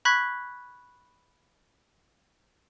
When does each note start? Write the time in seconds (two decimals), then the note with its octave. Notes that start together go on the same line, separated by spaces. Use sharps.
0.05 B5 C#6 F#6 G#6 B6